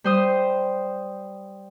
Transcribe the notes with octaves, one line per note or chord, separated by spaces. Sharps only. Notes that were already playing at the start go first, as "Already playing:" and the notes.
G3 C5 D#6